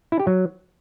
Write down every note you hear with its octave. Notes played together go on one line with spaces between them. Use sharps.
E4
G4
F#3